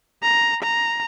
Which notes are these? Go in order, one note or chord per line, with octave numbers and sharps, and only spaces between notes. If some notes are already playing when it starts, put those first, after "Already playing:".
A#5
A#5